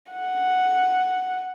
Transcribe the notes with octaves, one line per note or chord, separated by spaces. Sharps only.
F#5